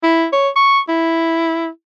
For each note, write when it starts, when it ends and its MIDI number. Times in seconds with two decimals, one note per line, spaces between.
0.03 0.26 64
0.33 0.49 73
0.56 0.79 85
0.89 1.68 64